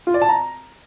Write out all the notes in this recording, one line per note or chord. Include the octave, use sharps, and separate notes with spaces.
F4
D5
A5
A#5